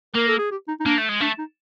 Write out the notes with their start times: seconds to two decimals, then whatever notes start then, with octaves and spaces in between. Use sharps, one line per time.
0.15 A#3 A#4
0.28 A4
0.38 G#4
0.51 G4
0.68 D#4
0.80 D#4
0.86 A#3 D4
0.98 A3
1.09 G#3
1.21 A3 D4
1.39 D#4